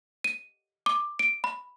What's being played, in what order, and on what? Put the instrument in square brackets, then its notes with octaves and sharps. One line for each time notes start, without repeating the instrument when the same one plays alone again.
[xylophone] D#7
D6
D7
B5